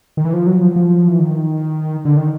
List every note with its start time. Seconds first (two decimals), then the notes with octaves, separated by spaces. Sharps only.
0.17 D#3
0.25 E3
0.33 F3
0.47 F#3
0.61 F3
0.76 F3
1.08 E3
1.19 D#3
2.05 D3
2.17 D#3